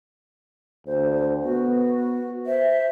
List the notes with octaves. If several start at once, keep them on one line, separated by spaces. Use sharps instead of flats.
D2 C5
B3 F#4
C5 E5